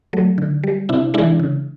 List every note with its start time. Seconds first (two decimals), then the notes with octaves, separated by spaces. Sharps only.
0.13 F#3 A3
0.38 D3
0.64 G3
0.89 C3 D4 E4
1.14 G#3 D4 E4
1.18 E3
1.39 C#3